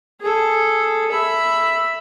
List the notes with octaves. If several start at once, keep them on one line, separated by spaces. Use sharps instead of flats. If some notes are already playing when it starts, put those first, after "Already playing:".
G#4 A4
E5 B5